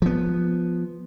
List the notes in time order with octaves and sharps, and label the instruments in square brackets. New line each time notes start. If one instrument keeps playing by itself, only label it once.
[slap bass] F3 B3